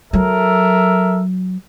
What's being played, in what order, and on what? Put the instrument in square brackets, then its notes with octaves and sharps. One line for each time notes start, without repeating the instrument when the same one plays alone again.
[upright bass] F#3 [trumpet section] A4 A#4 E5